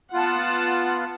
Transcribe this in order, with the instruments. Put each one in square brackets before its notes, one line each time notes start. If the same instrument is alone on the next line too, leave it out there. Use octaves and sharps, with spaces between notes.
[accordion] B3 F4 [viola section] F#5 A5